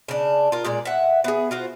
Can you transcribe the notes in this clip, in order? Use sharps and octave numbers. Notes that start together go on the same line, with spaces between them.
C#3 D4
F4 A#4
A#2 G#3 D5
E5 F#5
B3 G#4
F4 F#4 C5